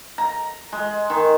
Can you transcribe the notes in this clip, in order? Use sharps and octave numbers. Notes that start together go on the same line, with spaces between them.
A#5
G#3
D#3